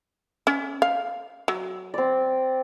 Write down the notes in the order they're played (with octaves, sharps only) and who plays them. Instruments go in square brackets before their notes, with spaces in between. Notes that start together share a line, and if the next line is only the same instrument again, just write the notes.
[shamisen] C#4
F5
F#3
[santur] C4 D5